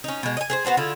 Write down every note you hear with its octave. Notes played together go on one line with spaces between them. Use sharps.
C#4 D#4
B2 G#3
D#5 G#5
G#4 B4 C5
B3 F#4 C5 A5
D3 E4 F4 G#4